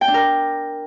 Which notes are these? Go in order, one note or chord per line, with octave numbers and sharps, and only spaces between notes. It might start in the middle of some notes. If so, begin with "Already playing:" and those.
G5
D4
A#4